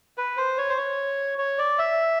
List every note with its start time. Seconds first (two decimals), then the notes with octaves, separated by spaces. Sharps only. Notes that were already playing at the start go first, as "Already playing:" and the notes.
0.18 B4
0.37 C5
0.58 C#5
0.70 C5
0.77 C#5
1.38 C#5
1.58 D5
1.79 E5